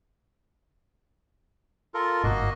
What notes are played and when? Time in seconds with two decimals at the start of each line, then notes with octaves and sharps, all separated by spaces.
1.94 F4 A4 A#4
2.23 G1 G#2 A#3 F#4 D#5